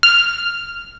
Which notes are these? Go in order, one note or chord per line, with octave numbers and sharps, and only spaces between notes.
F6